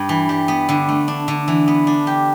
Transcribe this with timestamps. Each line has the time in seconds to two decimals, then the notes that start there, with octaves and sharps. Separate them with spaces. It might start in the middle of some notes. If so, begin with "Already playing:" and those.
Already playing: G2
0.09 E3
0.29 G3
0.48 B3
0.69 D3
0.89 A3
1.08 D4
1.28 D3
1.48 E3
1.68 B3
1.87 D4
2.07 G4